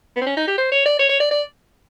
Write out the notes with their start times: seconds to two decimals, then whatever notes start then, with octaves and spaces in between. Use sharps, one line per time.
0.16 B3
0.21 C4
0.26 C#4
0.37 D#4
0.47 G4
0.58 C5
0.72 C#5
0.86 D5
0.99 C#5
1.09 C#5
1.20 D5
1.31 D5